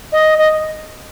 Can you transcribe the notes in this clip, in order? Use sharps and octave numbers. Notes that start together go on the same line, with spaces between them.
D#5
D#5